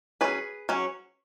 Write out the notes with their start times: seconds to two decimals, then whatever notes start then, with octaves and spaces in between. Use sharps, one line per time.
0.21 F#3 C#4 G#4 B4
0.69 F#3 C#4